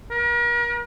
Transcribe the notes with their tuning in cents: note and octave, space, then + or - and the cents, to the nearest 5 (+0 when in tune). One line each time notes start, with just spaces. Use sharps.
A#4 +40